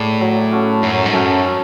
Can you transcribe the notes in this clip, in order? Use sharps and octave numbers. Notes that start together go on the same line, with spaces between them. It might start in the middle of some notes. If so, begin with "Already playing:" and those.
Already playing: A2 G#4 D5
F#3
C#4 F#4 A4
F#2 F#3
G#2
F#2 C#4 F#4 A4
C#4